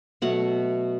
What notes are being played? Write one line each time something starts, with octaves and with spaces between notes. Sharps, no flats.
B2 F#3 A3 F#5